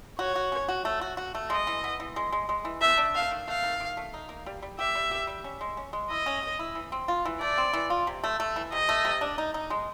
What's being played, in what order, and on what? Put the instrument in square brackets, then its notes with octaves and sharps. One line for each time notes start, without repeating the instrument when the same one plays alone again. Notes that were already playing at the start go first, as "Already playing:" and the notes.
[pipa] F#4 [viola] C#5
[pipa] F#4
C#4
F#4
A3
F#4
F#4
A3
[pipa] G#3 [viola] D#5
[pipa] E3
B3
E3
G#3
G#3
G#3
E3
[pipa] A3 [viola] E5
[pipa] D4
[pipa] A3 [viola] F5
[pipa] D#3
[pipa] A3 [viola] F5
[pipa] D#3
D#3
A3
D#4
A#3
G3
G3
[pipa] G4 [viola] E5
[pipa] G3
G4
G3
C#4
G#3
C#4
G#3
[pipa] E4 [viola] D#5
[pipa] C#4
C#4
E4
E3
C4
F4
E3
[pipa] A3 [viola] D5
[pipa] C4
E3
F4
C3
A3
A3
E3
[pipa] C3 [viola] D#5
[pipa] A3
C3
D4
D#4
D#4
G#3